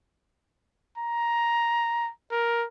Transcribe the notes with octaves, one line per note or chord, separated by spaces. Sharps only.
A#5
A#4